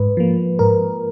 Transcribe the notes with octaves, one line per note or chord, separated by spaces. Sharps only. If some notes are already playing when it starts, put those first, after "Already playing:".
Already playing: G#2 B4
F3 A#3
G#2 A#4